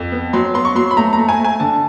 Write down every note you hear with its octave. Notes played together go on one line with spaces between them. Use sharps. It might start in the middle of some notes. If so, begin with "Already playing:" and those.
Already playing: F2
B3
F#3 C6
B3 C6
C#6
F#3 C6
B5
A3 A#5
A#5
A3
G#5
A3
G#5
D3 A5